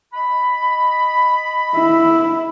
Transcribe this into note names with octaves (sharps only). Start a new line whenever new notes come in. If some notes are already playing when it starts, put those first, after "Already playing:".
D#5 B5
E4